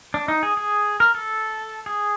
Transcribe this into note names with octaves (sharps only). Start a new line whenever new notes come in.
D4
D#4
G#4
G#4
A#4
A4
G#4